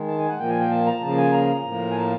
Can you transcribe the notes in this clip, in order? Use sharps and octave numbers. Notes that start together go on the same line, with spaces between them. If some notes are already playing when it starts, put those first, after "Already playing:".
Already playing: D#3 G#3
A5
G#5
F#5
A#2 F3 A#3 G5
G#5
G5
A5
A#5
C#3 F3 A#3 A5
G#5
A#5
A2 F3 A#3
G#5
A5